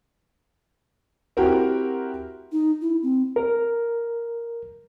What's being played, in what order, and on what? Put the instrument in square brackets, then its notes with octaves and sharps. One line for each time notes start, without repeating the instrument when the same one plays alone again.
[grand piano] C4 E4 F#4 G4 A#4
[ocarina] D#4
E4
C4
[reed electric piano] A#4